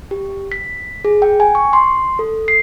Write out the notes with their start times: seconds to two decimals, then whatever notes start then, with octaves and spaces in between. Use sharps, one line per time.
0.11 G4
0.52 B6
1.05 G#4
1.22 G5
1.40 G#5
1.55 C#6
1.73 C6
2.19 A4
2.48 C7